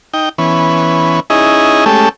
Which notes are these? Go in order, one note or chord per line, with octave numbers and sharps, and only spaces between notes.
D#4 G5
E3 B3 C#4
C#4 D#4 E4 G#4 D#5
G#3 A3 C#4 G4 A4